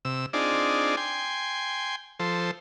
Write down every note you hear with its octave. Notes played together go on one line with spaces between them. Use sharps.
C3 E6
C4 D4 D#4 F4 G#4 D5
G5 G#5 C6
F3 A4 C5